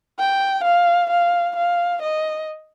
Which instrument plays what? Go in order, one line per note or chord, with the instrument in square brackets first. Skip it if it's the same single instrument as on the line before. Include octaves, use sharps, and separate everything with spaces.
[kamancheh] G5
F5
F5
F5
D#5